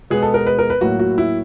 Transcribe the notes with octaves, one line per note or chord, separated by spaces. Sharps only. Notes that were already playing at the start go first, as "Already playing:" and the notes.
B2 G#3 B3 G#4
A4
A#4
B4
A#4
B4
A2 F#3 A#3 F#4
F#4
E4